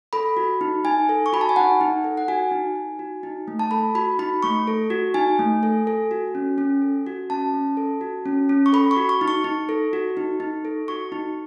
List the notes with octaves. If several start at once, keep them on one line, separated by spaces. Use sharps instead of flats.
A4 B5
F#4
D#4
D#4 G#5
A4
C#6
F#4 B5
A5
G#5
D#4 F#5
D#4
A4
F#5
F#4 G#5
D#4
D#4
F#4
D#4
A3
A5
A4 B5
F#4 B5
D#4 B5
A3 C#6
A4
F#4
D#4 G#5
A3
A4
A4
F#4
C#4
C#4
A4
F#4
C#4 A5
C#4
A4
F#4
C#4
C#4
C#6
A4 B5
C#6
F#4
C#6
D#4
C#6
D#4
A4
F#4
D#4
D#4
A4
F#4 C#6
D#4